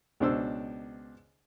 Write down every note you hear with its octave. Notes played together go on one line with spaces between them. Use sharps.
C#2 B2 D4 C5 E6